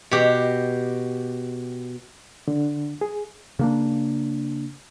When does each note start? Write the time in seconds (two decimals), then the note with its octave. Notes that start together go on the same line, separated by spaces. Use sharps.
0.11 B2 G4
2.48 D3
3.01 G#4
3.59 C#3 A#3 D4